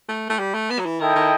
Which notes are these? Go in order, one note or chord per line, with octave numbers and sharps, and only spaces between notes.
A3
A3
G3
A3
B3
F#3
E3
D#3 E4 A4 D#5 G5
D#3